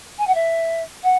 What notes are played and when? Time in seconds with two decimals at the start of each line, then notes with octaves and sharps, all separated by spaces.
0.19 G#5
0.27 F#5
0.35 E5
1.03 F#5